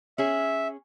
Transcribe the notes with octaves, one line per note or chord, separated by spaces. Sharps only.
C#4 G#4 E5